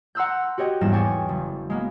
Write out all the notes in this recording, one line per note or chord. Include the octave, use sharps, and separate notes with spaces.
F#5 A#5 C6 E6 F#6 G6
F#4 G4 C#5 D#5 G5
E2 G#2 G3 A#3 A#6 E7
G5 G#5 C#6 D6 A6
F#1
G#3 A#3 B3